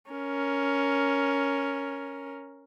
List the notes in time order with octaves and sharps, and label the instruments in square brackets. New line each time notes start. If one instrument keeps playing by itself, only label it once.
[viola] C#4 A#4